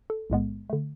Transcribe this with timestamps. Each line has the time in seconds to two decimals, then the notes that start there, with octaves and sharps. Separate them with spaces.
0.10 A4
0.30 B1 A2 G#3 B3
0.70 D3 A3